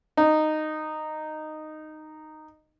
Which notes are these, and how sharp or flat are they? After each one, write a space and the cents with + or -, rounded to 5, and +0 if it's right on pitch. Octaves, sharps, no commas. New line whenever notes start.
D#4 -10